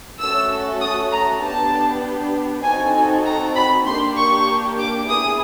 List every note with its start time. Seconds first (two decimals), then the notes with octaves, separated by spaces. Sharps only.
0.20 A3 C#4 F#4 A4 E6
0.81 D#6
1.12 A#5
1.43 B3 D4 G4 A5
2.64 C4 D#4 F#4 A4 G#5
2.95 G#5
3.26 A#5
3.55 B5
3.86 A#3 D4 G4 C6
4.17 C#6
4.78 D6
5.08 B3 E4 G#4 D#6